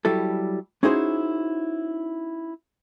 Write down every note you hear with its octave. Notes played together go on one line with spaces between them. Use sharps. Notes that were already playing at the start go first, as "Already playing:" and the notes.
F#3 G3 E4 A4
C#4 D#4 E4 F#4 G#4 C5